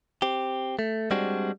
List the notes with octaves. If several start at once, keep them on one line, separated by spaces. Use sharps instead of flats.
C4 G4
A3
G3 G#3 C4 D4 F#4